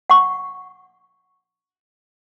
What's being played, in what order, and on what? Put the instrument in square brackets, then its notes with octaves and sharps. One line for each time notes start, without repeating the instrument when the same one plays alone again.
[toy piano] F#5 C#6